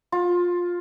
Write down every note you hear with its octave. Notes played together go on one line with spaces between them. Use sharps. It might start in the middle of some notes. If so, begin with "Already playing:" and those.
F4